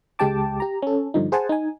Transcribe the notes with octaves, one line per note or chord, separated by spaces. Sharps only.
C#2 G#3 G4 G5 A5 D6
G4 A#5
C#4 A4
G2 D3 F3 D#4
G#4 C5 F#5 G#5 A5
D#4 G#5